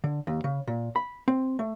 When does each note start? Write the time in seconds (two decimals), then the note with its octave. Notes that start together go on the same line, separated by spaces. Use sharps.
0.04 D3
0.27 D#2
0.44 C#3
0.67 A#2
0.96 B5
1.28 C4
1.59 A3